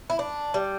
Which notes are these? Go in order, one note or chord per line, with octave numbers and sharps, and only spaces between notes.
E4
D4
G3